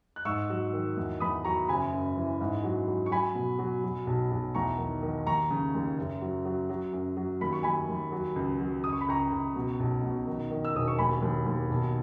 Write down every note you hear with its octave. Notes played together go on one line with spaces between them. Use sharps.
F#6
G#2 C#6 E6
F#3
D#3
E2
E2 B5 D#6
F#3 A#5 C#6
F#1 G#5 B5
F#2
E3
G#2
F#3
F#3
C#6
F#3 G#5 B5
B2
F#3
F#3
B1
B1
E2 A#5 C#6
D#3
D#3
D#2 A#5 C#6
C#3
D#2
F#1
F#3
F#3
F#3
F#2
F#3
D#2 B5
C#6
D#2 G#5 B5
D#2
F#3
C#2
F#3
C#2 D#6
C#6
B5
C#2 A#5 C#6
C#2
B2
B1
B2
D#3
D#3
E6
E1 D#6
C#6
D#2 G#5 B5
D#2
D#2
B1